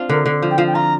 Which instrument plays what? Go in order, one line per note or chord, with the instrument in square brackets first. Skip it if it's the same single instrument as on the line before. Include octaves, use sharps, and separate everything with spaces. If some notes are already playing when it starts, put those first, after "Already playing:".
Already playing: [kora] C4 D4 F4
[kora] D3 [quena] A#4
[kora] D3
F3
[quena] G5
[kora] F3 [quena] F5
[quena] G5
[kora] F4 [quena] A#5